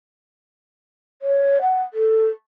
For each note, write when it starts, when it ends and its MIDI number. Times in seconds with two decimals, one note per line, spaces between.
1.22 1.59 73
1.62 1.82 78
1.93 2.26 69